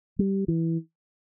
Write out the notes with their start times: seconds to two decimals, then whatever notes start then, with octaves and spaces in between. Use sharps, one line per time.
0.19 G3
0.48 E3